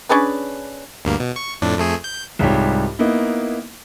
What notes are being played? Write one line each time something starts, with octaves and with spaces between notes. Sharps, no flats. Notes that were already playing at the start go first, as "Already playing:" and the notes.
C#4 D4 G#4 B4
D2 G2 A#3
B2
C#6
F2 A2 D4
F2 A3 G#4
G6
C2 G#2 G3 F4 G4 C#5
A#3 B3 D#4 E4